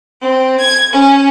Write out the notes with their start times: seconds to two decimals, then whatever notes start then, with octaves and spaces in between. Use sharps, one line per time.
0.22 C4
0.58 G#6
0.92 C#4